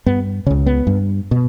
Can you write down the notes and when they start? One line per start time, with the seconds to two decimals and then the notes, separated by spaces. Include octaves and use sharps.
0.06 G2 B3
0.46 C#3 C#4
0.50 C#2
0.66 B3
0.87 G2
1.31 B2